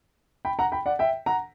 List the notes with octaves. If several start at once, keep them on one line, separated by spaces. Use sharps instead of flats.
G5 B5
F#5 A#5
G5 B5
D5 F#5
E5 G5
F#5 A#5